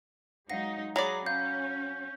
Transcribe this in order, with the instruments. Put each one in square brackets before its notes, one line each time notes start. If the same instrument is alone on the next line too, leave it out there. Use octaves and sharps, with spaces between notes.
[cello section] F#3 G#3 D#4 [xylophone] F5 F#5 A#6
[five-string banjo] F#3 D5 [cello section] G#4 [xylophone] A#5 B5 A#6
[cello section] C#4 [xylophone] F5 [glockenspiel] G6